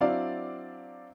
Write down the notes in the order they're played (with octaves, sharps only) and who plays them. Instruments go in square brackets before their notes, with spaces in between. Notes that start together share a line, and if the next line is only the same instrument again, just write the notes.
[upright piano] F#3 C4 D4 E4 D5 F5